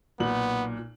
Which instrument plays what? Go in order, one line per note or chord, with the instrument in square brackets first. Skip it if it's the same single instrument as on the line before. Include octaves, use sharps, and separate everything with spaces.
[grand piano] B1 A#2 F#7 [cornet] B3